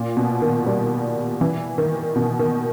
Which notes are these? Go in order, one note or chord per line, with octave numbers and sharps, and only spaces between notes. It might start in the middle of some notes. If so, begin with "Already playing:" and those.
Already playing: A#2
B2
D#3
G3
E3
D#3
B2
D#3